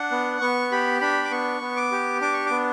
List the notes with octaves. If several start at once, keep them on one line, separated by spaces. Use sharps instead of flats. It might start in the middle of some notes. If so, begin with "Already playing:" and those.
Already playing: D4 F#5
B3
B3 C#6
G4 B5
D4 B5
D6
B3 C#6
B3
D6
G4
D4 D6
C#6
B3 D6